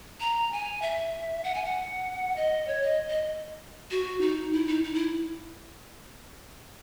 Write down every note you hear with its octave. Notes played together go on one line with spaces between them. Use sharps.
A#5
G#5
E5
F#5
G#5
F#5
D#5
C#5
D#5
D#5
F#4
D#4
E4
D#4
D#4
E4